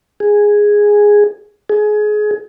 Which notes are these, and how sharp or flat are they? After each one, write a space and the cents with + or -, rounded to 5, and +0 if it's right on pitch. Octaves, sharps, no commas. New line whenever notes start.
G#4 -5
G#4 +25